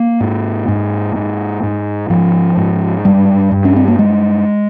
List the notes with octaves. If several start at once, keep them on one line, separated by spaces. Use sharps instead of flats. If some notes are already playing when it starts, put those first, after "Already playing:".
Already playing: A#3
G#2
G#2
G#2
G#2
G#2 F3
G#2
G2 G3
G2
C#4
C4
A#3
G2 G#3